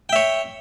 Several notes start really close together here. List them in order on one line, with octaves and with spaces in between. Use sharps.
G5 E5 C#5